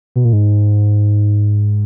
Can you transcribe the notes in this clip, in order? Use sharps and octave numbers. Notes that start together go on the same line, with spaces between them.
B2
A#2
G#2